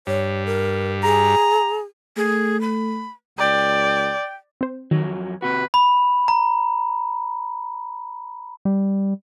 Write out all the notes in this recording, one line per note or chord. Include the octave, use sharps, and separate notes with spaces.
G2 C#5
A#4
G#4 A#5
A3 G#4
B5
C#2 D5 G5
C4 C5
F2 D#3 F#3
C3 F#4 B4
B5
A#5
G3